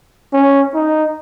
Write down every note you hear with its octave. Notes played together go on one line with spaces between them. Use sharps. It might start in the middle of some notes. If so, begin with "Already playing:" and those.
C#4
D#4